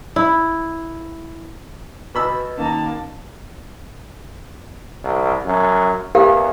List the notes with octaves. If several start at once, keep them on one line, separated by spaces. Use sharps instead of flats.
E4
B2 B4 D#5 B5 E6
D#3 A#3 C#4 A5
C2
F#2
E2 G4 A#4 F5